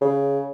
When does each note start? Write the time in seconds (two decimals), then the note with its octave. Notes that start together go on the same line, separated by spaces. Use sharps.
0.01 C#3